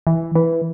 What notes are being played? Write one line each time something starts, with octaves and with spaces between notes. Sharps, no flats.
E3
E3